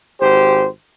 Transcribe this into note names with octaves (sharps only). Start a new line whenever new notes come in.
G#1 G4 C5